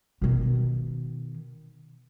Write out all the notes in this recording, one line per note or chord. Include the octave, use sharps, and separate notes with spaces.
B2 D#3